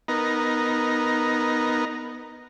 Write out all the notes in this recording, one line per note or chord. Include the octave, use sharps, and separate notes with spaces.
B3 D#4 A#4